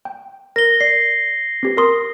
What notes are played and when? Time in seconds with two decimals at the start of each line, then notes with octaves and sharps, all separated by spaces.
0.05 G5
0.56 A#4 A#6 G7
0.81 D5 C7
1.63 C4 G4 B4
1.77 A#4 C6 D#6